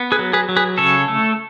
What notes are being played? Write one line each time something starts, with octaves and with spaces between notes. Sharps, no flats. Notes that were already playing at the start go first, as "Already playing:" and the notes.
Already playing: B3
G#4 B4
F#3
G#4 B4
F#3
G#4 B4
C#3 A4 C#5
A3